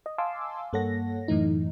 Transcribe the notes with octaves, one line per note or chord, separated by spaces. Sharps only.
D#5
F5 G#5 A5 C6 D6 E6
G2 A#3 A4 C#5 F#5 A#6
F#2 A2 E3 A3 D#4